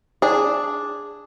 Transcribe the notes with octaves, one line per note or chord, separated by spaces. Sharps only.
D4 G#4